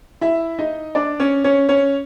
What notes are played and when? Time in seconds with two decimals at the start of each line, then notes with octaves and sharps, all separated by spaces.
0.21 E4 E5
0.59 D#4 D#5
0.95 D4 D5
1.20 C#4 C#5
1.44 C#4 C#5
1.69 C#4 C#5